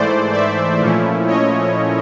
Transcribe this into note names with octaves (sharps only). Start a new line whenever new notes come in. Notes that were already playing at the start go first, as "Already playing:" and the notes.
Already playing: G#2 E3 A3 C5 D5
D5 E5
A#2 F3 A3 C#4 E4
C#5 D#5